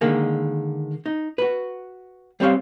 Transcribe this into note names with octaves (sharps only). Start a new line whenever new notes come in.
D3 D#3 G#3 A#3
D#4
F#4 B4
G3 C4 G4 C5 C#5 F5